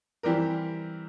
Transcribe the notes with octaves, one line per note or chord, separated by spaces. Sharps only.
E3 G3 C4 G4 A#4